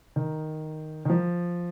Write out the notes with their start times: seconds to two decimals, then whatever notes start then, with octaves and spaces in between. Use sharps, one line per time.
0.16 D#3
1.05 D#3
1.10 F3